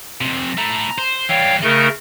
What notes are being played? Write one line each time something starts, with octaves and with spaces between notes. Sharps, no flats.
F2 C3
A3 E4 A#5
C5
E3 G3 C#5 F5 G5
C#3 A3 D#4 A#4